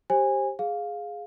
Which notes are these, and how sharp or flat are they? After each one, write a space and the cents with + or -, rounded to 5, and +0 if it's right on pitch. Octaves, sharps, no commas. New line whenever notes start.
G4 +0 C5 +30 G#5 -20
G#4 +0 F5 +10